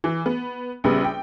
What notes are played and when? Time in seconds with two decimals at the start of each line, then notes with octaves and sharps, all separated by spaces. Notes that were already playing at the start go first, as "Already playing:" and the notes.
0.04 E3
0.26 B3
0.84 A#1 C#3 G3 B3 B4
1.04 G5